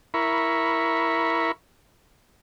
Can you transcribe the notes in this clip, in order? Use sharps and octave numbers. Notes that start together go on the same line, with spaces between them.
E4 A#4 B5 C#6